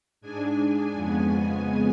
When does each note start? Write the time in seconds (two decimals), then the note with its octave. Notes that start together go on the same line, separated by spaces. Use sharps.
0.21 G#2 G#3 D4 G#5
0.92 F2 C#3 G#3 B3